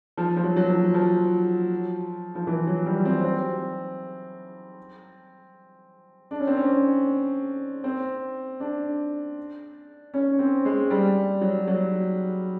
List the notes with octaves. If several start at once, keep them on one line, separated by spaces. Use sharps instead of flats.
F3
F3
F#3
F#3
F3
F3
F3
E3
F#3
G3
C4
C4
D4
C#4
C4
C#4
C4
D4
C#4
C4
G#3
G3
F#3
F#3